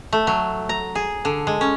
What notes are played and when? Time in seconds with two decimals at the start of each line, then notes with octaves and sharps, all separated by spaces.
0.13 A3
0.27 F#3
0.69 A#5
0.95 G#4
1.25 D3
1.47 G#3
1.61 C#4